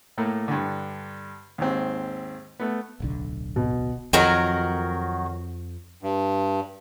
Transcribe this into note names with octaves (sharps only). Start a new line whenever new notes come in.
A2 A3 A#3
G2 D3
D#2 G#2 C4
A3 B3
D1 B1 D3
B2
F2 D#3 F#3 A#4
G2